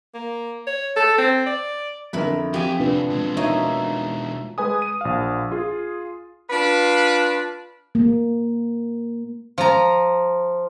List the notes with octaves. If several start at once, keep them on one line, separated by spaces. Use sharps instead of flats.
A#3
C#5
A4
C4
D5
F2 D3 E4 A#4 B4
F2 C4 G4 G#4 G5 G#5
C3 F3 D4 F4 B4
B2 G#3
A#3 D#4 F#4 C#5 E5
G#3 B4 G#5 D#6
D#7
A#1 F5
F4 G#4
D4 F4 B4
A#3
F3 A#5